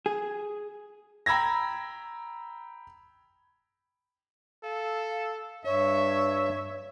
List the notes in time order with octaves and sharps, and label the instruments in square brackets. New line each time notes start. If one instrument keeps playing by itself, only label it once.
[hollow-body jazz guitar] G#4
[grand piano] G5 A#5 B5 E6 G#6 A#6
[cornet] A4 [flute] F5
[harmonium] G2 [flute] C#5 [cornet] E5